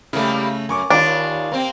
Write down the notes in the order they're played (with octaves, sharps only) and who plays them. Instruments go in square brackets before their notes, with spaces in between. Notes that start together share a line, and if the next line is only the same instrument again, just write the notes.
[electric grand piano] C#3 A3 [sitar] G3 A#3 E4
[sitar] F#2 [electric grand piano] G#5 C#6 D6
[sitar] D#2 F4 [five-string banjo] D4
[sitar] A#3 C4